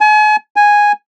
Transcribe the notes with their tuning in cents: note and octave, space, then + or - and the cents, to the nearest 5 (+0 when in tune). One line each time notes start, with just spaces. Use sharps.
G#5 +40
G#5 -5